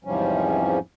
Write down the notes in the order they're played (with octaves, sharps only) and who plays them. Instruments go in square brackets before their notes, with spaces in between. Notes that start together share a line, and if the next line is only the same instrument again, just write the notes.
[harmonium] E2 G#2 C3 F3 G3 C#4